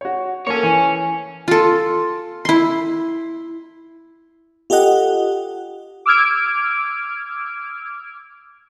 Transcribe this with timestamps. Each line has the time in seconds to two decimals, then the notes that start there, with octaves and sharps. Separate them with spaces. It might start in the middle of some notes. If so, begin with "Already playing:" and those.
0.01 F#4 C#5
0.47 A#3 A4 C#5 G#5
0.63 E3
1.48 F4 A4
2.45 E4 C6
4.70 F4 G4 A4 D#5 F#5
6.06 D6 E6 F6 G#6 D7